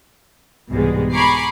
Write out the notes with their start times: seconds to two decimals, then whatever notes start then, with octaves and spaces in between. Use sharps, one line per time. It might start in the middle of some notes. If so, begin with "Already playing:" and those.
0.69 C2 G#2 B2 E3 G3 G#3
1.13 G#5 A#5 B5 C#6 D6 C7